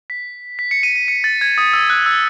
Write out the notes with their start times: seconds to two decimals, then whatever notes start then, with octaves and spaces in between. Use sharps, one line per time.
0.10 B6
0.59 B6
0.71 C#7
0.83 D#7
0.96 D#7
1.08 C#7
1.24 A6
1.41 G#6
1.58 D#6
1.73 E6
1.90 F#6
2.06 E6